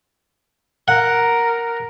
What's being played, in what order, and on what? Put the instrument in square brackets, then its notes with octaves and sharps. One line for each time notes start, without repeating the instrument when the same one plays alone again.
[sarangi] A#4 [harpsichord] F#5